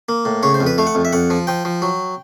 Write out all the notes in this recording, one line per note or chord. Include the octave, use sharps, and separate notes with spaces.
A#3
A2
C#3 C#5
C5
F2
B4
A3 F5
F#5
F2
E5
F2 F#5
F3
F3 G5
F3
F#3